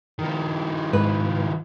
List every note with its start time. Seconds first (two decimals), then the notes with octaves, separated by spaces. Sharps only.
0.19 D#3 F3
0.93 G#2 B4